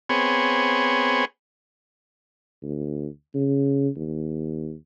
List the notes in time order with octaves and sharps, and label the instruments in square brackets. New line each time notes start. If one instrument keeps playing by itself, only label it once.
[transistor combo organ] B3 C4 G#4 C#5
[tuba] D2
C#3
D#2